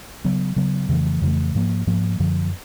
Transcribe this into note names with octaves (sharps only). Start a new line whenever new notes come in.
C#3 F#3 B3
C#3 F#3 B3
F2 C#3 E3 A3
F2 C#3 E3 A3
G#2 F3 A#3
G#2 F3 A#3
F#2 D3 F3